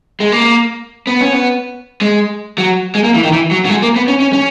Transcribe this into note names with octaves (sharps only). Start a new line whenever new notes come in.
G#3
A#3
B3
C#4
B3
G#3
F#3
G#3
A#3
E3
D#3
E3
F#3
F#3
G#3
A#3
B3
C#4
C#4
C#4